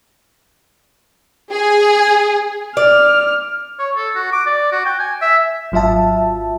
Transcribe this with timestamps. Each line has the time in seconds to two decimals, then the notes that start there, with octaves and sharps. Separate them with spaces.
1.52 G#4
2.77 D5 F6
3.79 C#5
3.97 A4
4.15 F#4
4.32 D6
4.47 D5
4.72 F#4
4.86 G5
4.99 G#5
5.21 E5
5.72 G#1 F#3 F4 E5 A5